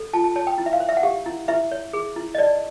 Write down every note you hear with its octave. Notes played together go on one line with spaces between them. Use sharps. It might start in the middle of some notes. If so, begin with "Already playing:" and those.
Already playing: A4
F4 A5
A5
C#5 A5
G5
E4
E5
F5
C5
E5
F#5
G4 F5
E4
E4 E5
C#5
G#4
E4
D#5
D#4 D5